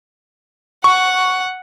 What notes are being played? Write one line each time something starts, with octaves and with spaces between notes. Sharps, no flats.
F#5 C#6